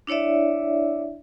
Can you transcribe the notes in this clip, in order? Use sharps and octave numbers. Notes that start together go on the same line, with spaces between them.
D4 E4 C#5 D5 E5